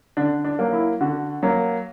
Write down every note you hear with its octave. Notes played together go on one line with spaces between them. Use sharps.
D3 D4
D4
F#3 A#3
E4
D3 F#4
F#3 A#3